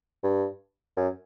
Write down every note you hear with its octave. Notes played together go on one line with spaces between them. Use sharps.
G2
F#2